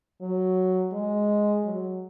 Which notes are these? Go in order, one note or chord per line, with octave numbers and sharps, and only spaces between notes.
F#3
G#3
F#3